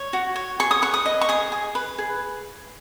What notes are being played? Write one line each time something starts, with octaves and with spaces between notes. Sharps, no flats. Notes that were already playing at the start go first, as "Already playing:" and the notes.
Already playing: C#5
F#4
C#5
G#4 C#6
D#6
B4 C#6
D#6
D#5
C#6
G#4 D#6
G#4
B4
G#4